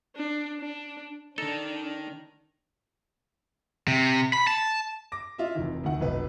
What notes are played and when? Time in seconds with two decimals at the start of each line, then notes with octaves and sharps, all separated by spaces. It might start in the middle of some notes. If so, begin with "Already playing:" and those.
0.16 D4
0.60 D4
1.38 D#3 D4 D#4 A4
3.88 C3
4.33 B5
4.47 A5
5.12 D6 A#6
5.38 F4 D#5 E5
5.55 F1 C3 D#3 E3
5.83 D2 D#3 F#5
6.00 F1 B1 B4 D#5